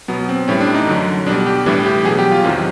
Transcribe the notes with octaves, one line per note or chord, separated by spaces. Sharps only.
B2 F#3 B3
C4
A2 E3 G3 C#4
D4
D#4
F#2 D3 F#3
B2 G3 D4
G4
A2 E3 G3 D4
G4
B2 F#3 G#4
G4
F4
E2 C3 D#3 F#3